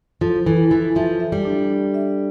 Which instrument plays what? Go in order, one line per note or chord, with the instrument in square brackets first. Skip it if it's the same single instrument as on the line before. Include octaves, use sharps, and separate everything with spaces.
[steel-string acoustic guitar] F3 [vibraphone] A4
[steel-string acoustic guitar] E3 [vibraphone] A4
[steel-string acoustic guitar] E3 [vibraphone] A4
[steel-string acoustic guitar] F3 [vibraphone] E5
[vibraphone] E5
[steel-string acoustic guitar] G3
[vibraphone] D4
D4
E5